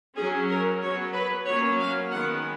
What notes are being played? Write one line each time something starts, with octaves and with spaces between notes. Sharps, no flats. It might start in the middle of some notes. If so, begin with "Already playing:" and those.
F#3 C#4 G#4
A#4
F#3 B3 C#5
B4
F#3 A#3 C#4 C#5
F5
D#3 G#3 B3 F#5